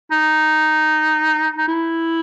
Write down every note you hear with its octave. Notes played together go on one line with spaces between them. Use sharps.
D#4
D#4
E4